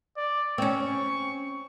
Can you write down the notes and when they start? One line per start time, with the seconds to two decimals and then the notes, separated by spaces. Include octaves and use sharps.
0.17 D5
0.58 C4 C#4 C#6